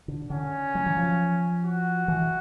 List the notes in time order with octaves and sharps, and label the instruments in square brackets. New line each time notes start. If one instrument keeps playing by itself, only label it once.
[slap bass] D3
[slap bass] D3 [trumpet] C#4
[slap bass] F#3
E3
F3
[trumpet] F#4
[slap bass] E3